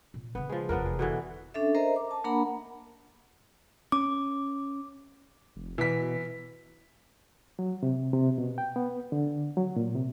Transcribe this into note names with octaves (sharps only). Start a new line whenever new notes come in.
A#2
C#3 B3 D4
F3 G#3
F1 E2 B3 D4 A#4
G#3
B2 D3 E3
C#4 D4 A4 E5
A#4 C5 D#5 E5 A#5
D6
A5
A#3 D4 A#4 F#5 A#5 B5
C#4 D6
F1
B2 E3 B6
F#3
C3
C3
B2
G5
B3
D3
F#3
A#2
C3